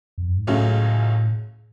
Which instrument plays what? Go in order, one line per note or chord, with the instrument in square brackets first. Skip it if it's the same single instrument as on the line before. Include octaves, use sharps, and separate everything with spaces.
[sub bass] F2
F#2
G#2
[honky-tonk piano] C#2 C#3 F#3 A3 C#4 [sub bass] A2